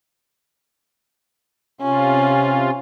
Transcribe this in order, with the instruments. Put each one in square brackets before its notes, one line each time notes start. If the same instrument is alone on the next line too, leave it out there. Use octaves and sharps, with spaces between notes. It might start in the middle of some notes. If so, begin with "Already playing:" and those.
[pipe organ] C3 F4 [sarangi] C#4